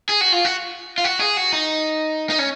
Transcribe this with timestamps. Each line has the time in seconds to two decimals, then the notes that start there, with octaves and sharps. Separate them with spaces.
0.09 G#4
0.21 F#4
0.32 F4
0.45 F#4
0.98 F4
1.04 F#4
1.20 G#4
1.37 F#4
1.52 D#4
2.30 D#4
2.39 C#4